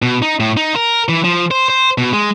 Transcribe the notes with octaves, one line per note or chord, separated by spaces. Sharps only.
B2
D#4
A2
D#4
A#4
E3
F3
C5
C5
B2
G#3